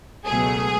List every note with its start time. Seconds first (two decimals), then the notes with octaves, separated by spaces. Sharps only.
0.26 C#2 B2 F#3 A3 G#4